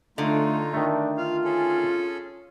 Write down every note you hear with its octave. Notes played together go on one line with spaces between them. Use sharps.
D3 A3 D#4 F4
D#3 A3 D4
F4 F5
C#4 G#4 A4